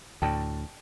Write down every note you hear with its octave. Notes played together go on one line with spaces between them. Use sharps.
D2 A2 D5 G5 A5